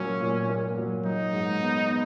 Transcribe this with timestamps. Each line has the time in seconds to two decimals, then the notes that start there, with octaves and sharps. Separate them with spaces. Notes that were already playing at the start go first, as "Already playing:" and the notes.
Already playing: A#2 F#3 A#3 C#4
0.20 A#2
0.49 A#3
0.78 F#3
1.05 F#3 D#4
1.33 G#2
1.61 B3
1.90 B3